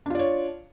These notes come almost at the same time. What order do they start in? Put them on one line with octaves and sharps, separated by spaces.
D4 F4 D5 C#5